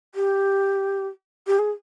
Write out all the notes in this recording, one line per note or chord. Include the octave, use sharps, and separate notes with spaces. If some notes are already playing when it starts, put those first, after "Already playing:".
G4
G4
G#4